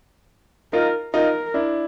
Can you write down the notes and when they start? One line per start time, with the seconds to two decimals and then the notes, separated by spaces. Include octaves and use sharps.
0.73 D#4 F4 A#4
1.14 D#4 F4 A#4
1.54 D4 E4